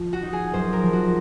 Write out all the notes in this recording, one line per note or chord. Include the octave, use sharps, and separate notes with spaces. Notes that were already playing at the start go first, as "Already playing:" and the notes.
Already playing: F3
F#4
D#4
G#4
F#2 C5
A#4
F3
F#4